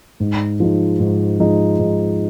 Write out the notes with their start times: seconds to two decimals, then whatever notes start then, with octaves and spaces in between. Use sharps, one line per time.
0.20 G#2
0.60 F3 G#3 D#4
1.00 G#2
1.40 F3 G#3 D#4
1.79 G#2